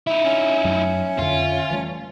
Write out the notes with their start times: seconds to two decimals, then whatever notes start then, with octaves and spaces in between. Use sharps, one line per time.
0.07 D#4 E4 E5
0.25 C#4
0.64 F#2 F#3 A3
1.18 F2 D3 F4
1.71 E3 G3 A3